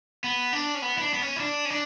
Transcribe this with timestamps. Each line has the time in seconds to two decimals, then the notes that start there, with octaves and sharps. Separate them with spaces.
0.24 B3
0.53 D4
0.75 C#4
0.82 B3
0.98 E4
1.01 D4
1.14 B3
1.22 C#4
1.36 E4
1.40 D4
1.65 C#4
1.70 D4